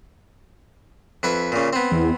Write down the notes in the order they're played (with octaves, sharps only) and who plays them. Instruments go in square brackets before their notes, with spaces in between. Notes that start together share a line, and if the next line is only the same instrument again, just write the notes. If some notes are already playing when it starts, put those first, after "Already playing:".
[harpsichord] F2 B4 E5
A#2 C#3
B3 C4
[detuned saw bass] E2